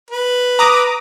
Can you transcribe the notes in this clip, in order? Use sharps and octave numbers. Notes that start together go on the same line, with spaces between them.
B4
A#5 D6 D#6